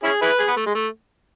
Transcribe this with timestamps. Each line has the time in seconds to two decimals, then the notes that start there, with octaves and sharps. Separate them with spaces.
0.04 C#4 E4 G#4
0.22 E4 G#4 B4
0.39 G#4
0.48 B3
0.57 A3
0.66 G#3
0.75 A3